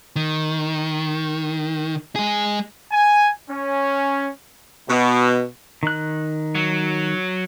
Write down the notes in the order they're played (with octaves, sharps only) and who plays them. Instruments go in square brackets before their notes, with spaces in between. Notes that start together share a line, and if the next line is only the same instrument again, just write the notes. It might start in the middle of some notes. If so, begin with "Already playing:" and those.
[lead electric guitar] D#3
G#3 G#4
[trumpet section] G#5
C#4
[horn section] B2
[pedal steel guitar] D#3 F#6
[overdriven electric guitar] F#3